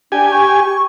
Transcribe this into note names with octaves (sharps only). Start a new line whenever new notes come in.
D4 G4 G#5
C#6